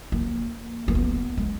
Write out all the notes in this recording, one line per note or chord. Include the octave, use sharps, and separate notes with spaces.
A#3
A#3
B3
G#3